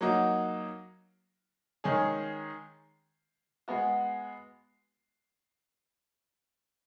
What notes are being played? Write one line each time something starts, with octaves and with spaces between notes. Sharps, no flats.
F#3 A#3 D#4 F#4
D#3 G#3 C#4 G#4
G#3 B3 F#4